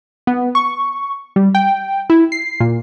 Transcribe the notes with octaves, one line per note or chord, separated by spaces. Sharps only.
B3
C#6
G3
G5
E4
C7
A#2